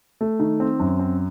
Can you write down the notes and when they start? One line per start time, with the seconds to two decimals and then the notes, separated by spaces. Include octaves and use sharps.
0.21 A3
0.40 D#3
0.60 C4
0.80 F#2
0.99 C4